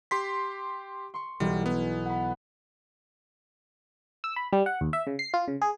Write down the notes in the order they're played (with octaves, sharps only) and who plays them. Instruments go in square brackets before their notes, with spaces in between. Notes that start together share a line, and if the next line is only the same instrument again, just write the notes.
[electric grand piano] G4 C6 B6
[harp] C6 C#6
[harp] B1 E3 [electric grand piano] G3
[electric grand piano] B3 [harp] G#5
[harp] F#5 B5
[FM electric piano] E6
B5
G3
F#5
D#2
E5
C#3
C7
F4
C#3
G#4